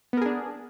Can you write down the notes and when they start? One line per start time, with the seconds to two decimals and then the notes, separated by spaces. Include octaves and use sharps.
0.13 B3
0.17 A#4
0.21 G#4
0.26 D4